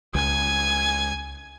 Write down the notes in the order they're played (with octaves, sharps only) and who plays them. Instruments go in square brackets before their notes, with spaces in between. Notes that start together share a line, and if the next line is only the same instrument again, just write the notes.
[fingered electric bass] C#2 [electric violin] G#5 G#6